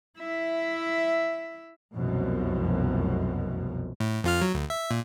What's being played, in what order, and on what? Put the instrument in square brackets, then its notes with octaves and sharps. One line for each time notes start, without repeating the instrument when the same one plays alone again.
[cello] E4 E5
[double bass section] F1 C2 F#2 B2 F3
[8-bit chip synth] A2
F2 F4 F6
F#3
D2
E5
A#2